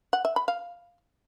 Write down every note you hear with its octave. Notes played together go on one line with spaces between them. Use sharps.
F#5
E5
B5
F5